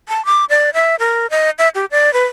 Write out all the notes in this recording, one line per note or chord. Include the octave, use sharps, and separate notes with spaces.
A5
D6
D5
E5
A#4
D#5
E5
G4
D5
B4